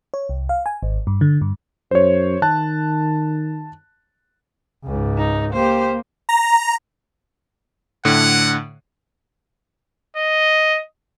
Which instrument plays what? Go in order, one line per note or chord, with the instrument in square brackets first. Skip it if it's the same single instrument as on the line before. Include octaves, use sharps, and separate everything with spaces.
[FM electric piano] C#5
C2
F5
G#5
G#1
G2
D3
G2
[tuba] F#2 [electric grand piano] C5 C#5
[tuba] D#3 [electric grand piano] A5 F#6
[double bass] C#2 G#2
[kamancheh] D#4
[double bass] A#3 [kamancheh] G4 C5
[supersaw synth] A#5
[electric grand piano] A2 D3 [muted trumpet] F#5
[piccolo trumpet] D#5